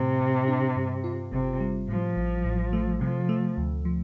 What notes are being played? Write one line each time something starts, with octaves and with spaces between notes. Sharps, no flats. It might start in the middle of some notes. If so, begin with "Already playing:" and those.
Already playing: A2 C3
A2
D4
G2
F4
G1 C3
G3
A2 F3
A1
A1
A3
C3 F3
A3
D2
F3